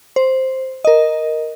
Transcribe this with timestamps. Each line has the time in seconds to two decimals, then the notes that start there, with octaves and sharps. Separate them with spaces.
0.16 C5
0.85 A#4 D#5